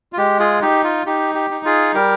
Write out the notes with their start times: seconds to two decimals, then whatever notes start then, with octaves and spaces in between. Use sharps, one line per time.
0.13 F4
0.18 G#3 G4
0.40 F4 G#4
0.62 D#4 G4
0.84 F4
1.06 D#4 G4
1.35 G4
1.50 D#4
1.65 F4 G#4
1.94 G3 G4 A#4